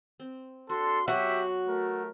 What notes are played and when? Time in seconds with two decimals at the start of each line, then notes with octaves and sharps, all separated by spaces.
0.20 C4
0.70 D4 F#4 A4 C6
1.08 F#3 B3 F#4 G4 E5 F#5
1.68 A3 A#4